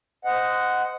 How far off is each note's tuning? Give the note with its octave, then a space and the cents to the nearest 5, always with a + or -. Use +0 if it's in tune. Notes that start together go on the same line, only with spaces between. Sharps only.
C5 -20 D#5 +0 F#5 +0